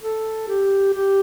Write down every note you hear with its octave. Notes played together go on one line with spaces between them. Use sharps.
A4
G4
G4